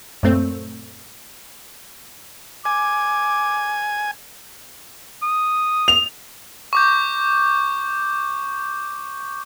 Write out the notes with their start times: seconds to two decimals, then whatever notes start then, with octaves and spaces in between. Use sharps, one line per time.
0.23 F#2 A#2 A3 C4
2.65 G#5 D6
5.23 D#6
5.88 F7
6.73 C#6 D6 G6